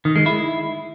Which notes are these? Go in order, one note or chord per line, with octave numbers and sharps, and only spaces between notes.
D#3
G#3
E4